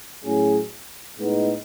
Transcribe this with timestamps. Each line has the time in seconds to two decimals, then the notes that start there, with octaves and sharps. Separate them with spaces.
0.24 A2 F#3 C#4 G#4
1.18 A2 G#3 B3 D#4